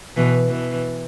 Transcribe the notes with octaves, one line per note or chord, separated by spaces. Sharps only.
B2 E3
B2 E3